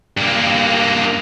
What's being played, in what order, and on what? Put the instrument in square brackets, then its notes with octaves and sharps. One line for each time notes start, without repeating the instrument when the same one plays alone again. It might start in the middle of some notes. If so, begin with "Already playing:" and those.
[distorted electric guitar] G2 A#3